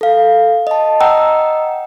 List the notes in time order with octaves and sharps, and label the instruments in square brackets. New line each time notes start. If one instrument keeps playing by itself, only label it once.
[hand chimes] A4 F5
D#5 A5
D#5 F#5 G5 A#5 E6